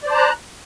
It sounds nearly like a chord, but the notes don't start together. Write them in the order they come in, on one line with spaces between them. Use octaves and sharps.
D5 C5 A5 A#5 F#6